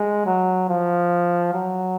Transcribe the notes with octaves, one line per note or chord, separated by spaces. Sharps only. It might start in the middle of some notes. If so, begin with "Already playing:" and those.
Already playing: G#3
F#3
F3
F#3